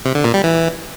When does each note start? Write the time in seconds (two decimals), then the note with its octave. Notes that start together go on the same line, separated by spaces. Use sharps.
0.05 C3
0.15 D3
0.24 A#2
0.34 G3
0.44 E3